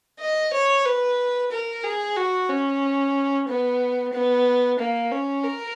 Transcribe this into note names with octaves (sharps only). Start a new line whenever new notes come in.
D#5
C#5
B4
A#4
G#4
F#4
C#4
B3
B3
A#3
C#4
A#4